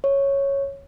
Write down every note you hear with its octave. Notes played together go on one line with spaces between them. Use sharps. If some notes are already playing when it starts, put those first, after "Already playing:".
C#5